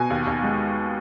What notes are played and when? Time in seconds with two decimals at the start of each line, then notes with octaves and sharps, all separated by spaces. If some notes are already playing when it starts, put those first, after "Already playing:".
Already playing: B2 G#5
0.10 D#2
0.27 D#2
0.44 G#3